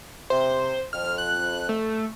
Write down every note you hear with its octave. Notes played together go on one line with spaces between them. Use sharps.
C3 C5
F2 F6
F#6
A3